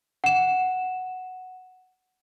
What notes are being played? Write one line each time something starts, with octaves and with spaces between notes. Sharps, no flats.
F#5 E7